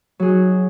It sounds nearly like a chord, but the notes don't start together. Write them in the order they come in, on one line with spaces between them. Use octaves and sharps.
F#3 G#4 F#4 D#4